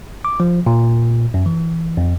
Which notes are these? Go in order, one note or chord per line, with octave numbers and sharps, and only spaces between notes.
D6
F3
A#2
F#2
E3
F2